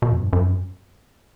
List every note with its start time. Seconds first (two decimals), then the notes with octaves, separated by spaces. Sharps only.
0.02 B2
0.12 F2
0.22 G2
0.33 F#2